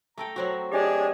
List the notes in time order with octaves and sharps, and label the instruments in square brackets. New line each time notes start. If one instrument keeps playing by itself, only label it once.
[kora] A3 A4 G5 [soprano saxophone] A#5
[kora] F#3 C4 F#4
[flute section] D4 G#4 [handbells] G4 D#5 G5 [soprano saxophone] C#5